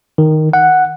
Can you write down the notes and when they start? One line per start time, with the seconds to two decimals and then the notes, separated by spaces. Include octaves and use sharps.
0.18 D#3
0.53 F#5